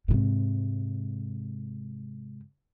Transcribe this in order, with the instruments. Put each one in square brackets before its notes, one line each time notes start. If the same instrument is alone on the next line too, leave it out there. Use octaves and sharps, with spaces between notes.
[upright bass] G#2 C3